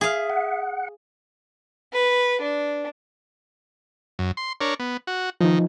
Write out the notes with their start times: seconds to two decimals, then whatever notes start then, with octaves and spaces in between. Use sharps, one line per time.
0.01 G#4 E5 F5
0.30 F#5
1.93 B4
2.41 D4
4.19 F#2
4.37 C6
4.61 D4 A#4 C#5
4.79 B3
5.07 F#4
5.41 D#3 F3 D#4